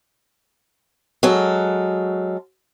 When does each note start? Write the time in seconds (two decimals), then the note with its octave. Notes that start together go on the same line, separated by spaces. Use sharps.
1.23 F#3 G#3 A4 A#4